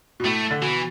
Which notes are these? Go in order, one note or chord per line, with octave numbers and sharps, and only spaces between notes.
B2
A2 A3
D3
B2 E3